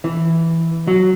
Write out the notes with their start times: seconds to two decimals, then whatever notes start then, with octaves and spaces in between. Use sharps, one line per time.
0.04 E3
0.87 F#3